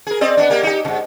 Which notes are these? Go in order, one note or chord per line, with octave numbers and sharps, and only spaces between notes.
G#4 A#4
C4 D5 D#5
B3 C#4 D4
A#3 G4 A#4
D#4 G4
G#2 C#3